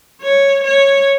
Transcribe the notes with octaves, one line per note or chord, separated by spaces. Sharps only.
C#5
C#5